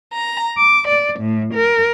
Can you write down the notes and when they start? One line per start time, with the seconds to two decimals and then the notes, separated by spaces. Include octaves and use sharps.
0.14 A#5
0.57 D6
0.88 D5
1.19 A2
1.53 A#4